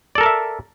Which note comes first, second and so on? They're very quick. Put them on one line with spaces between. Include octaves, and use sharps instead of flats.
D5 A4 A#4 A5 E5